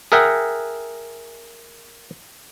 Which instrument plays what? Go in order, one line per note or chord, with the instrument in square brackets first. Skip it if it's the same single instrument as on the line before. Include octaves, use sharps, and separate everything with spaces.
[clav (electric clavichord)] G#4 A#4 E5 F#5 G5